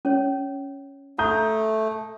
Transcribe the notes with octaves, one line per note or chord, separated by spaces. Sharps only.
C#4 C#5
A3 A#5 D#6 G6